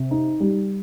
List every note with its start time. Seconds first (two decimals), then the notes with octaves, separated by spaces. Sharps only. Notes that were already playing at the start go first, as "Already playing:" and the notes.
Already playing: C3
0.11 D#4
0.40 G3